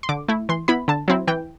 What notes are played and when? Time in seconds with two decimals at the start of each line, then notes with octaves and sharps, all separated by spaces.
0.03 C6
0.09 D3 D6
0.28 A3 E4
0.49 E3 C6
0.68 B3 E4 B5
0.88 D3 A5
1.08 F#3 C4 E4
1.28 E3 G5